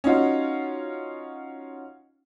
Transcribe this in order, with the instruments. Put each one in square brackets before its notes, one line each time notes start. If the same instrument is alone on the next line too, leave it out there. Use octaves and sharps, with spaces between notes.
[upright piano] C#4 D#4 F4 F#4